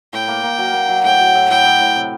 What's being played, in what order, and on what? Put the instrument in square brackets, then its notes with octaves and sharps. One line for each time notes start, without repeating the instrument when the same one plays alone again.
[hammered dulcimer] A2 [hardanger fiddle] G5
[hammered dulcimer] A#3
A#3
F#3
A#3
F#3
[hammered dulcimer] A2 [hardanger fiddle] G5
[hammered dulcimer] F#3
A2
[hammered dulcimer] A2 [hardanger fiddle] G5
[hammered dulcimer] A2
A2
C3